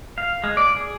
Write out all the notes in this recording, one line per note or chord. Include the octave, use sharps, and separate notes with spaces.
F5
G#3
D5
G#4